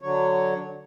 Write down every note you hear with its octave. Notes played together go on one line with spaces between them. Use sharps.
D3 F#3 C#5